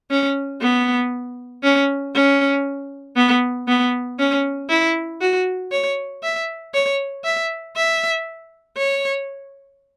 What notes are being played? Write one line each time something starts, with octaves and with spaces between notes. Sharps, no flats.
C#4
B3
C#4
C#4
B3
B3
C#4
E4
F#4
C#5
E5
C#5
E5
E5
C#5